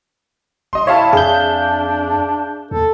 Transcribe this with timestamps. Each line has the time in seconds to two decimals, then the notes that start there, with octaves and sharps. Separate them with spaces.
0.73 D#1 D#5 C6
0.87 E4 C#5 E5 F5 A5
1.13 F2 D4 G#4 G6
2.71 D#2 A4